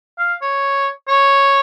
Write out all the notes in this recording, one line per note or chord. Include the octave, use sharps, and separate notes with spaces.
F5
C#5
C#5